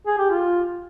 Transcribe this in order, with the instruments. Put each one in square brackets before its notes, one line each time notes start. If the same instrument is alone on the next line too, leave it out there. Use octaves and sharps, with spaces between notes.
[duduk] G#4
G4
F4